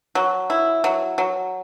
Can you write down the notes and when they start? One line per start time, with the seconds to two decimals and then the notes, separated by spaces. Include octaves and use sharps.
0.15 F#3
0.50 E4
0.84 F#3
1.18 F#3